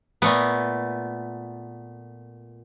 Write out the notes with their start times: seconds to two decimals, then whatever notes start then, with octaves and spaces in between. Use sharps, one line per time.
0.22 A#2 A3 B3